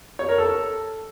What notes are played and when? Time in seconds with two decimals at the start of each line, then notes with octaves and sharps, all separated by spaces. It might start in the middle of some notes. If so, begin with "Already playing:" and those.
0.19 C#5
0.29 A#4
0.38 A4